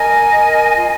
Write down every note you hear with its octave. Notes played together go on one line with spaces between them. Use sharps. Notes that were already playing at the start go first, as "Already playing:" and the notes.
Already playing: A#4 D#5 G#5
A#4
F4